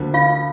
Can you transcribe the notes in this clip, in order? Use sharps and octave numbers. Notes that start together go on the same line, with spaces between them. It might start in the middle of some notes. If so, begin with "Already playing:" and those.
Already playing: D2 D3 F3 A#3
F4 F5